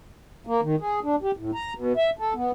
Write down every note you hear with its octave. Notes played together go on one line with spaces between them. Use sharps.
A#3
D#3
G#4
D4
G4
A2
A#5
B2
E5
A4
B3